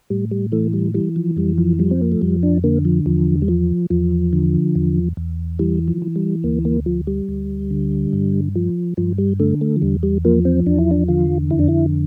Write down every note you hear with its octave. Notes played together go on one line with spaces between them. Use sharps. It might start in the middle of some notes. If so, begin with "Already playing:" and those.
A2 G3
G3
E3 A3
G3
E3 G3
F3
F2 G3
F3
F3 G3
C4
A#3
A3
F2 G3
D4
D3 A#3
F3
E2 F3
G3
F3
E2 F3
D3
E2
E2
E3 G3
F3
E3
G3
D2 A#3
A#3
F3
G3
D2
D3
G2
F3
G2 F3
G3
D3 A3
A3
F3
E2 G3
G3
F3 A#3
C4
E2 D4
E4
D4
D3 F4
F2 E4
D4
E4